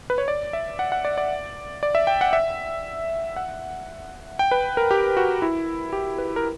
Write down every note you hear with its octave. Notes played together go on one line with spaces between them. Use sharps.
B4
C#5
D5
E5
F#5
F#5
D5
D5
D5
E5
G5
F#5
E5
F#5
G5
B4
A#4
G4
F#4
E4
G4
B4
A#4